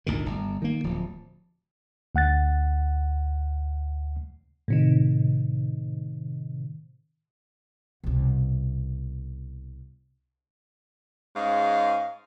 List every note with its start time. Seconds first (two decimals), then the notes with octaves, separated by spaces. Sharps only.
0.06 G#1 D2 A#2 D#3
0.26 G1
0.62 D#3 A#3
0.84 D1 F3
2.15 D2 F#5 F#6 A6
4.68 A2 C3 D#3
8.04 C2 B2
11.36 G#2 G#3 C#4 F5